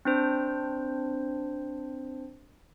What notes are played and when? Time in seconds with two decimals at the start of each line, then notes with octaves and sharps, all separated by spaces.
0.05 C4 D4 C5